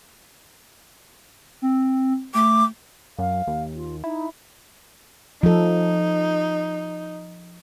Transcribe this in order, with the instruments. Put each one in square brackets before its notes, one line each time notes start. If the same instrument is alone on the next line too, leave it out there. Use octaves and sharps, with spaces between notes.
[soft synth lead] C4
[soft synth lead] A3 [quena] D6
[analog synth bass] F#2 [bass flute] F5
[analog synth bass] D#2
[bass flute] F4
[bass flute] D#4 [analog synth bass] E4
[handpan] F3 A4 [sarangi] D#4